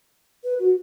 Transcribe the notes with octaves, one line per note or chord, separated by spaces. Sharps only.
B4
F#4